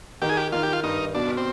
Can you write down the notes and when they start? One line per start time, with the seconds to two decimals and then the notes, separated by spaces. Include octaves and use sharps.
0.22 D#3 G4
0.29 G#4
0.37 G4
0.52 D#3 F4
0.63 G4
0.73 F4
0.83 G2 D#4
1.15 B2 D4
1.37 C4